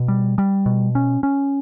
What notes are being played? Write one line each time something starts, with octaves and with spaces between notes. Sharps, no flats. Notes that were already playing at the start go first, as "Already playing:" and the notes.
Already playing: B2
G3
G3
B2
C#4
C#4